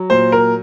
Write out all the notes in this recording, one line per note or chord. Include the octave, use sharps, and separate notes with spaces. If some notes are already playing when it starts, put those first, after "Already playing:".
Already playing: F#3
A#2 C5
A#4